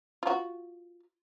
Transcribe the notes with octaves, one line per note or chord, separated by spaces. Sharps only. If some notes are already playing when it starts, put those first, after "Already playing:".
F4 F#4